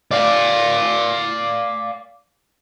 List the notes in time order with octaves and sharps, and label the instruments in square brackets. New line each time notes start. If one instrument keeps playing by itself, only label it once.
[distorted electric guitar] D5 F5